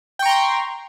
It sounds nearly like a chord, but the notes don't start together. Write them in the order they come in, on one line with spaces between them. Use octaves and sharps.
G5 C#6 A#5 C6